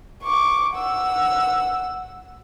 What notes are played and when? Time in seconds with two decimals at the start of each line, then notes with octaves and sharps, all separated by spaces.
0.23 C#6 D6
0.75 F#5 E6